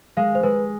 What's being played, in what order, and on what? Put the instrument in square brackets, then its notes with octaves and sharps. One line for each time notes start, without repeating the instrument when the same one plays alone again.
[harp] G#3 [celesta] F5
[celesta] C5
[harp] G#3 [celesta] B4